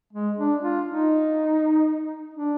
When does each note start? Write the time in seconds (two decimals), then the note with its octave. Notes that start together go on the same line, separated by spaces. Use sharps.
0.13 G#3
0.38 D4
0.62 F4
0.87 D#4
2.34 D4